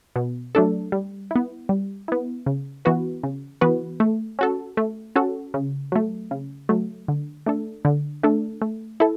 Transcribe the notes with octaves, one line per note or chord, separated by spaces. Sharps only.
B2
F#3 A3 D4 A4
G3
B3 E4
G3
B3 E4
C#3
E3 B3 F#4 B4
C#3
E3 B3 F#4 B4
A3
C#4 F#4 A4
A3
C#4 F#4 A4
C#3
F#3 A3
C#3
F#3 A3
D3
A3 D4 A4
D3
A3 D4 A4
A3
E4 A4